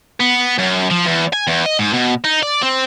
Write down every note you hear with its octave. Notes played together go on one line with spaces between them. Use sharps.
B3
F#2
F3
E2
G#5
E2
D#5
G#2
B2
D#4
D5
C4